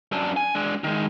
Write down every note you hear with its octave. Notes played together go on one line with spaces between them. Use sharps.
F#2 D4
G#5
G#3 D4
D#3 G#3